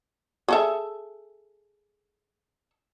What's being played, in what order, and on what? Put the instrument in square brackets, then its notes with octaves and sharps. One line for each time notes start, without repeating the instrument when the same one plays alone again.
[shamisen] G#4 A4 E5